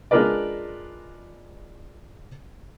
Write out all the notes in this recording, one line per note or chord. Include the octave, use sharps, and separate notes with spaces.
G#3 D4 F4 A#4 B4 D5